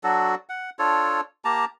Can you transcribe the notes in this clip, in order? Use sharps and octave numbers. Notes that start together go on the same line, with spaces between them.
F#3 D4 F#4 A4
F#5
D4 F4 A4 C#5
A#3 G4 A5 A#5